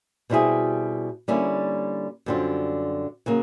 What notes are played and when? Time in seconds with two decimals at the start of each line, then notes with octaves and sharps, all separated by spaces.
0.30 B2 G3 C4 E4 G#4
1.28 D3 G3 A#3 C#4 E4
2.26 F#2 D3 G3 C4 F4
3.26 C#3 F#3 A#3